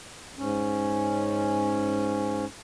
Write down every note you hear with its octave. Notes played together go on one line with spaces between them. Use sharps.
G#2 C#4